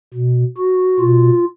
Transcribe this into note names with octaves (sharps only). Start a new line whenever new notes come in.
B2
F#4
B2 F4